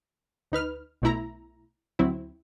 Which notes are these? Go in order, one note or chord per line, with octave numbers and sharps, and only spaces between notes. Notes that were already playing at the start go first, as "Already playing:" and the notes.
D2 D#4 B4 F6
B1 B2 A3 E4 A#5
D2 F#3 C4 E4